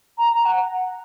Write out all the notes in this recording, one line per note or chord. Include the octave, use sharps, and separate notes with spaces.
A#5
A#5
F#5